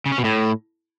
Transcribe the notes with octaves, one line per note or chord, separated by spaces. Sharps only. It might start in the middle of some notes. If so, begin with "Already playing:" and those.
C#3
C#4
B2
A2